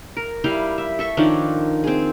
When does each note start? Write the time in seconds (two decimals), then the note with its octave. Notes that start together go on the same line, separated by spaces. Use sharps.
0.17 A#4
0.44 G3 E4 F5 G5
0.78 E5
0.99 A4 E5 C#6
1.17 D#3 F3 D4 C#5
1.84 C4 G#4